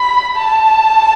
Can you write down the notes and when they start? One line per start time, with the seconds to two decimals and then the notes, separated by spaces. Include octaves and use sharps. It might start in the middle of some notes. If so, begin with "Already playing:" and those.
Already playing: B5
0.36 A5